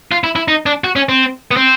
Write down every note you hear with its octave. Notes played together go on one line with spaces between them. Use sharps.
F4
E4
E4
D#4
D4
F#4
C#4
C4
B3
C4